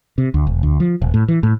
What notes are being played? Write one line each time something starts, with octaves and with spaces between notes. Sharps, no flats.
C3
D2
E1
D2
F3
D#1
A2
E3
A2